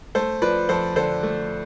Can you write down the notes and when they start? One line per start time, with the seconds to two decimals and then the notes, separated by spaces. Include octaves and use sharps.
0.15 A3 A4 C5
0.42 F3 B4 D5
0.69 F2 A4 C5
0.96 D3 A4 C5
1.23 A3